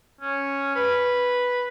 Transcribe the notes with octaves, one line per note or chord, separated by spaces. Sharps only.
C#4
B4